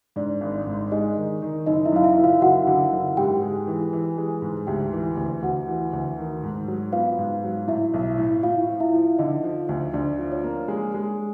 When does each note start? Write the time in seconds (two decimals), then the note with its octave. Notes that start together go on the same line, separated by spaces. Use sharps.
0.16 G#2 D4 D5
0.41 G#1
0.67 G#2
0.92 G#3 D#4 D#5
1.17 D#3
1.42 D#3
1.67 F#1 D#4 D#5
1.85 E4 E5
1.92 F#2 F5
2.04 E4 E5
2.17 F#1
2.24 F4 F5
2.41 F#1 F#4 F#5
2.67 D3
2.93 F#1
3.17 G#2 G4 G5
3.42 G#3
3.67 E3
3.93 E3
4.18 G#3
4.42 G#2
4.67 D2 G4 G5
4.93 E3
5.17 D2
5.42 D2 F#4 F#5
5.68 E3
5.93 D2
6.18 D#3
6.43 G#2
6.68 F#3
6.92 B3 F4 F5
7.19 G#2
7.44 F#3
7.68 A2 E4 E5
7.94 B1
8.18 A2
8.43 A2 F4 F5
8.69 F3
8.80 E4 E5
8.94 F3
9.19 D3 D#4 D#5
9.44 F3
9.69 D2
9.94 D2 D4 D5
10.19 F3
10.32 C#5
10.44 A#3
10.68 G#3
10.94 G#3